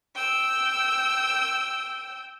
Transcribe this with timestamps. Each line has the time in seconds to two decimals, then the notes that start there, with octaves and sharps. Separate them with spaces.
0.15 G5 E6